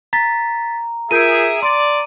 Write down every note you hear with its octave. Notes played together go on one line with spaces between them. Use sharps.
A#5 A6 B6
F4 G#4 A#4 E5 G6 D7 D#7
D5 C6